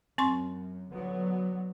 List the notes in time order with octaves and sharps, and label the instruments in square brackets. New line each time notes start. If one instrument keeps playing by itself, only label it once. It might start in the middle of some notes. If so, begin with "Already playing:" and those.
[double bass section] F#2 [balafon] C4 C6 C#6
[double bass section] D3 F#3 B3